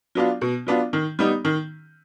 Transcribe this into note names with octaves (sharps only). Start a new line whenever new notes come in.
F#3 B3 D4 F4
B2
F#3 B3 D4 F4
D#3
G3 B3 D#4
D#3